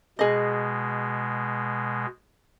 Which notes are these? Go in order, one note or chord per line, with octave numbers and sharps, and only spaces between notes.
B2 G#3 G#4 D#5